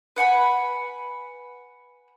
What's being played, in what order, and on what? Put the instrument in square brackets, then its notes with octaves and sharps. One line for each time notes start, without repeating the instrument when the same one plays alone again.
[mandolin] B4 F#5 G#5 B5